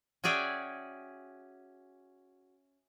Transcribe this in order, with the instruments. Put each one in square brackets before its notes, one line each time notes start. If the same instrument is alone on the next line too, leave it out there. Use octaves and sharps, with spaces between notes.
[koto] C#4 F#4 G#4 D5 E5 G5